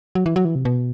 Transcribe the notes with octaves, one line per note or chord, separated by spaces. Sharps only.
F#3
E3
F#3
E3
C3
B2